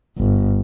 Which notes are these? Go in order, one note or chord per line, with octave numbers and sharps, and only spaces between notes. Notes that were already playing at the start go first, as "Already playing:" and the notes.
G1